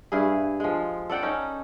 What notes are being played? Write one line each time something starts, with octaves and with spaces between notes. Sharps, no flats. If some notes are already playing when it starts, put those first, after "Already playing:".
G2 E4 G#4
F3 G#3
A4 D5 F#5 G5
C#4 D#4